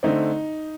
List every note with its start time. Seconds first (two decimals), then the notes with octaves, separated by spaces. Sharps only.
0.03 D3 A3 C4 D#4